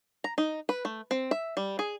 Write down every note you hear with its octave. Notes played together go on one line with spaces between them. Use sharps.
A#5
D#4
B4
A3
C4
E5
G3
G#4